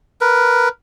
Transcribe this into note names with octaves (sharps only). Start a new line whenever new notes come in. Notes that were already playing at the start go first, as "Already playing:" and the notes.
A#4 B4